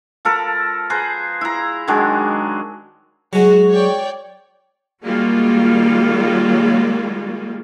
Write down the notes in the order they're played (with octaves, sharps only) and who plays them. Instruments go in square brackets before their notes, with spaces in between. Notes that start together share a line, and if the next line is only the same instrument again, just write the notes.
[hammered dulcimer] F3 A4 A#4 B5
G#4 B4 C5 A#5
E4 A#5
D#3 F#3 G#3 D4
[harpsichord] F#3 G#3 [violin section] F#4
[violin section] C#5 D5 G5
[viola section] D#3 G3 G#3 A#3 F4 F#4